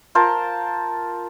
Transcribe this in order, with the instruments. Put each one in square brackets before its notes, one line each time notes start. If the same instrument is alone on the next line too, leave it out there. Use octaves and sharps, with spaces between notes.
[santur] F4 A#4 C5 A5